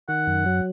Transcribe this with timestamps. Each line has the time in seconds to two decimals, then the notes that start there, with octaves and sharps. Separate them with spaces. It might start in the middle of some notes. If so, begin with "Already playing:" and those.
0.08 D#3 F#5
0.27 F#2
0.46 F#3